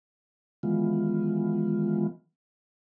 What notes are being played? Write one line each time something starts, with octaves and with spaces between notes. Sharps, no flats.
D#3 E3 F#3 G#3 B3 F4